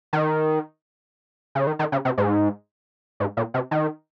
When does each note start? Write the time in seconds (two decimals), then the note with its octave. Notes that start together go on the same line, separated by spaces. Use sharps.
0.13 D#3
1.55 C#3
1.67 D#3
1.79 D#3
1.92 C#3
2.05 C3
2.18 G#2
3.20 G#2
3.37 A#2
3.54 C3
3.71 D#3